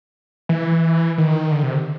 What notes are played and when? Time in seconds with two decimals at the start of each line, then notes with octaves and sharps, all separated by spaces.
0.49 E3
1.18 D#3
1.51 D3
1.63 C3